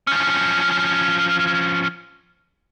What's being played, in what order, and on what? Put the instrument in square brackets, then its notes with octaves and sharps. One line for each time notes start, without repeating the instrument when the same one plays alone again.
[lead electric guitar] F3 C#4